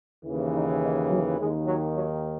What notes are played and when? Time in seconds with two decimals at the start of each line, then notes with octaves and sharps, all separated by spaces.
0.24 D#2 C#3 E3
0.52 D#4
0.81 D#4
1.09 F#3
1.38 D#2 D#3 G#3
1.67 F#3
1.96 F#3